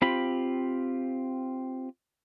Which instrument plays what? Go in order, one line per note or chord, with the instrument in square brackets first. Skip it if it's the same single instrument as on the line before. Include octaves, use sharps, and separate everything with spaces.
[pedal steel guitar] C4 F4 G4 B5